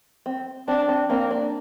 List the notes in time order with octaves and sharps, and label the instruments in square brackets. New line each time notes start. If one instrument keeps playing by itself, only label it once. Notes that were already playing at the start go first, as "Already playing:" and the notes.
[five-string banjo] C4
[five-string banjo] C4 [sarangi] D4
[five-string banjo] C4
[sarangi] A#3 [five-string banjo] C4
[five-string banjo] D4